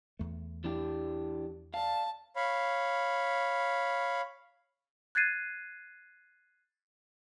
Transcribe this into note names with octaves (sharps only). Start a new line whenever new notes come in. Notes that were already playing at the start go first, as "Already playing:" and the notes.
E2 A3
E3 D4 G4
D5 F5 A5
C#5 F5 B5
F#6 G#6 A6 C7 D#7